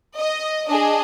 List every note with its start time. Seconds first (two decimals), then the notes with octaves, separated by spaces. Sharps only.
0.18 D#5
0.69 D4 G#4 D#5